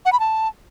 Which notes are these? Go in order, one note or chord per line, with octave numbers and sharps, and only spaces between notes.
F#5
B5
A5